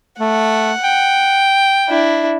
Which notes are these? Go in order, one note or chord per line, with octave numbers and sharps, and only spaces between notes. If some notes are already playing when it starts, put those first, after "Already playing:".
A3 F#5
G5
D4 E4